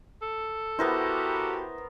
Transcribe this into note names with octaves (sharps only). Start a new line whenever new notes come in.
A4
B3 E4 F#4 G4 A#4 C5